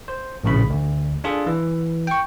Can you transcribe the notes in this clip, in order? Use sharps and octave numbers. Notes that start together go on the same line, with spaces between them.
C5
A#1 A2 C#3 B5
D2
D4 F4 G#4 A4
E3
G5 C#6